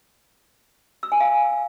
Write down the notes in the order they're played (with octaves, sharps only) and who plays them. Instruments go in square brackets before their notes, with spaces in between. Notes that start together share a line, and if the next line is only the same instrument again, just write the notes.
[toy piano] E6
G#5
F5